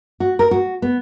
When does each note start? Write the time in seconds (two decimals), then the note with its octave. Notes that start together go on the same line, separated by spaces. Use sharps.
0.20 F#4
0.39 A#4
0.51 F#4
0.82 B3